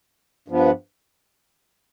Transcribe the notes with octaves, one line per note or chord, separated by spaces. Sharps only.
G2 F3 B3